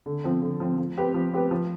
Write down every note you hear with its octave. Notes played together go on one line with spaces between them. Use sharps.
D3
F3 C4
D3
F3 C4
F3
C4 G4 B4
F3
C4 G4 B4
F3